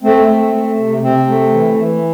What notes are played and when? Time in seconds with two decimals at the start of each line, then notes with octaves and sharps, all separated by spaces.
0.03 A3 C4
0.28 A3
0.53 A3
0.78 C3
1.03 C3 C4
1.28 A3
1.53 E3
1.77 E3